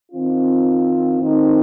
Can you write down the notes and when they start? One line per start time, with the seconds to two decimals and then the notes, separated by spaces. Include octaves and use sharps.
0.11 D#3 C4 F4
1.19 F2 D#3 C4 D#4